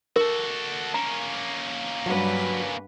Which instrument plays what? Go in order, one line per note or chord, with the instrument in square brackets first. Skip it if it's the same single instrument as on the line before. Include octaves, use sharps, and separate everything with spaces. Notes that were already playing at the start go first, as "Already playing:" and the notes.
[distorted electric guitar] F#4 A4 [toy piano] A#4
[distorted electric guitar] A#3 C#4 [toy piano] A#5
[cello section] G2 B4 [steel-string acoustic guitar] F#3